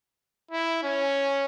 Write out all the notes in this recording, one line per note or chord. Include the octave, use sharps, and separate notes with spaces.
E4
C#4